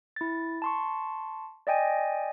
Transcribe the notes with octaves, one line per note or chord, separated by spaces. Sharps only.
E4 A6
A5 C6 C#6
D5 D#5 G5 G#5